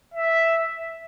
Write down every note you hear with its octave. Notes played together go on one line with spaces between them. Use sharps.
E5